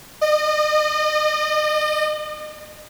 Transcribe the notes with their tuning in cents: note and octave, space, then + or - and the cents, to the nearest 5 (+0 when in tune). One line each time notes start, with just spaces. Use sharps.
D#5 -35